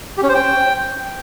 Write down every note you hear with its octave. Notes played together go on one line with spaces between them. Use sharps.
G4
C#4
C5
G5